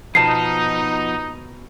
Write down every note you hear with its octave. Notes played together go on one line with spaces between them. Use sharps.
B2 F3 B3 D#4 A5 C7